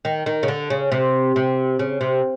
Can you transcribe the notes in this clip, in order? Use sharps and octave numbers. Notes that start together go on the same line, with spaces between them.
D#3
D#3
C#3
D3
C#3
C3
C3
C#3
C3